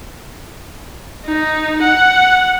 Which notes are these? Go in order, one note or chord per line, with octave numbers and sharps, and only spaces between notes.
D#4
F#5